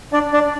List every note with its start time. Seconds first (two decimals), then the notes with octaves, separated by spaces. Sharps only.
0.13 D4 D5
0.33 D4 D5